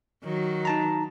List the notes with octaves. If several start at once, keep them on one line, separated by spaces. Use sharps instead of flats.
D#3 F#3
D#4 A5 A#5